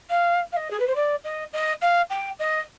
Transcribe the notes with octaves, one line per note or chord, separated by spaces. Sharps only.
F5
F5
D#5
G#4
B4
C5
D5
D#5
D#5
F5
G5
D#5